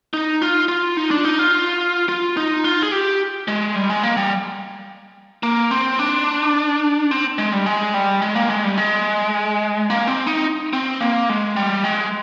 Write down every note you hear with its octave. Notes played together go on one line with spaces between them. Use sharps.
D#4
F4
F4
D#4
D4
D#4
F4
F4
D#4
F4
G#4
G4
G#3
G3
G#3
A#3
G3
A#3
C4
D4
C4
G#3
G3
G#3
G3
G#3
A#3
G#3
G3
G#3
A#3
C4
D#4
C4
A#3
G#3
G3
G#3